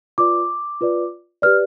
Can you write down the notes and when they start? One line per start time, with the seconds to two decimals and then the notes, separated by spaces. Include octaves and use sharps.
0.18 F4 B4 D5 D6
0.81 F4 B4 D5
1.42 G4 B4 D5 F6